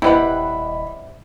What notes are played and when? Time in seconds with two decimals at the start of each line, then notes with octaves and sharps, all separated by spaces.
0.02 D#1 C3 G3 E4 B4 D#5 F#5 B5